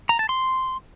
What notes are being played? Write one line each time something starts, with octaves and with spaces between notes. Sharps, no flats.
A#5
A5
C6